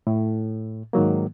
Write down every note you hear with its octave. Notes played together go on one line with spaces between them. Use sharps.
A2
G#2 D#3 F#3 A#3